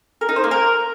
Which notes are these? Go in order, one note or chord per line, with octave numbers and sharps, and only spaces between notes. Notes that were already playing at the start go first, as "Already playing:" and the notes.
A#4
D#4
C5
A#3
A#4